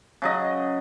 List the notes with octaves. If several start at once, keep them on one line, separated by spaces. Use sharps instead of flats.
C#3 F#3 D#5